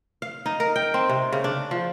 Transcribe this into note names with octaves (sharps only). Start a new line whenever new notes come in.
F5
D#4
A#4
G5
C4
C3
C#3
D4
F3